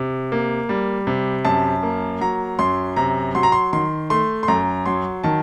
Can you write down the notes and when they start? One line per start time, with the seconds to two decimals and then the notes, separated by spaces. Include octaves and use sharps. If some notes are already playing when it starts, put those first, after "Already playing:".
Already playing: C3
0.32 A#3
0.69 G3
1.07 C3
1.45 F#2 A5
1.83 A#3
2.21 F#3 A#5
2.59 F#2 C6
2.96 C3 A#5
3.35 F#3 C6
3.43 A#5
3.52 C6
3.73 D#3 C6
4.10 A3 C6
4.43 C6
4.48 F#2 A#5
4.86 F#3 C6
5.24 D#3 A5